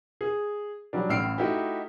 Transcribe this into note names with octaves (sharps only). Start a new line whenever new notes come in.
G#4
F#3 G3 D4
A1 A2 E6 F6 C7 D7
A3 D#4 E4 F#4 G4